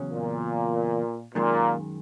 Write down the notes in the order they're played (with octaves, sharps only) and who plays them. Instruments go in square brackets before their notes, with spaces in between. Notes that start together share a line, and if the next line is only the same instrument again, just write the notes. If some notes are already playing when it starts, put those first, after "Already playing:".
Already playing: [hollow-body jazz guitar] E2 C#3 F#3 C#4
[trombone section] A#2
[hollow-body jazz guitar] F#2 D#3 G#3 [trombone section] A#2